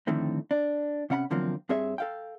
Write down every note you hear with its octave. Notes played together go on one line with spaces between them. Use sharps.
F2 A2 D3 D#3 A3 C4
D4
C3 C#4 F#5 A#5 B5
E2 D3 F3 F#3 A#3 C4
G2 C4 G#4 C#5 E5
A4 F5 G5